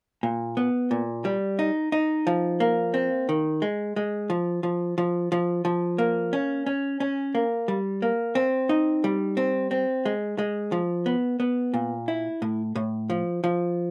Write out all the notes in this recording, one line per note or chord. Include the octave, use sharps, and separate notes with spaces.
A#2
B3
A#2
G3
D#4
D#4
F3
A#3
C4
D#3
G#3
G#3
F3
F3
F3
F3
F3
A#3
C#4
C#4
C#4
A#3
G3
A#3
C4
D#4
G3
C4
C4
G#3
G#3
F3
B3
B3
A#2
E4
A2
A2
F3
F3